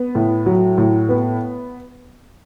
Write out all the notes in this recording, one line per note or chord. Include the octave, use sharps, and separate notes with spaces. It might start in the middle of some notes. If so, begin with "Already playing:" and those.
Already playing: B3
A2
F#3
A2
B3